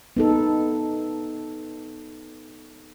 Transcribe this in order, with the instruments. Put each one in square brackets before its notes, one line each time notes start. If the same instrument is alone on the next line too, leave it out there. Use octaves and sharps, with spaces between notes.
[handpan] B3 D#4 A4